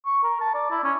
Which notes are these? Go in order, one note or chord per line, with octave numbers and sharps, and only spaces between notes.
C#6
A#4
A5
D5
E4
C#4